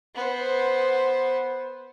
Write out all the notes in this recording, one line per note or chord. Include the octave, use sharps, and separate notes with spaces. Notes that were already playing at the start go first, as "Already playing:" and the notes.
B3 C5